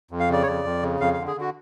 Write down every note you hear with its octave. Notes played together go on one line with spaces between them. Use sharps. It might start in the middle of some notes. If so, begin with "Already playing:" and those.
F2
F5
C#3 D5
C#5
F2 D5
F2
C#3
F2 F5
F5
D3
G#4
D3 F#4